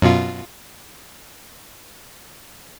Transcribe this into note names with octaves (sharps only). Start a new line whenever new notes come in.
F#2 B2 F4